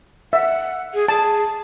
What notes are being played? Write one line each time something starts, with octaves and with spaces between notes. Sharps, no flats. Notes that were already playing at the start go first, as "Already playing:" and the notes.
E5 F#5
G#4
G#4 A5